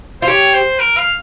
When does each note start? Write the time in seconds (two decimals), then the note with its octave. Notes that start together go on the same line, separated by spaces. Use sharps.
0.22 F4 C5
0.28 G4 C#5
0.54 C5
0.80 A#4
0.97 F5